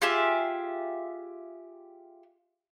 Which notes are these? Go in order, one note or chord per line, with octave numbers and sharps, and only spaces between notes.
F4 G4 G#4 E5